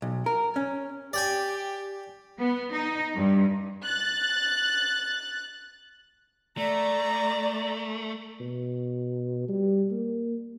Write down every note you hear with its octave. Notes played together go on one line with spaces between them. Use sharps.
B1
A#4
C#4
G4 D5 G5 G#5
B3
D#4
G2
F#6 A6
A3 D5 A#5
B2
G3
A#3